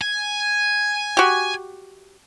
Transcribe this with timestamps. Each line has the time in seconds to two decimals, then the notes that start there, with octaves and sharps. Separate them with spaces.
0.01 G#5
1.17 F#4 G4